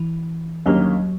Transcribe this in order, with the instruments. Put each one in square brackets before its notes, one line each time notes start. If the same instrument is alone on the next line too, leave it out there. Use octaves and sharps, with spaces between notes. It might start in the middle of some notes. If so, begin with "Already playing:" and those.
Already playing: [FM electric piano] E3
[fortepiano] D#2 D3 G3 A#3 C#4 [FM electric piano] F#3